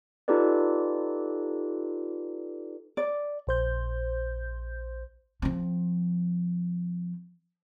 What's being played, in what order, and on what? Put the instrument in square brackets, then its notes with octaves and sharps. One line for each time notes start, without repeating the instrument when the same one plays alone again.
[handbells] D#4 F4 G4 A4 B4 D5
[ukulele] D5
[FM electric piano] A#1 C5 G6
[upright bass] F3 C4